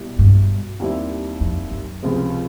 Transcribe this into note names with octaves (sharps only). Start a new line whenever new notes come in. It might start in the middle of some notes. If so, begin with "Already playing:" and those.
Already playing: B2 G3 B3 E4
G2
D#2 D#3 G3 C4 E4
F2
F#2
C#2 C3 F3 G#3 C4